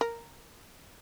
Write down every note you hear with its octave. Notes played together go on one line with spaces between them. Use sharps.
A#4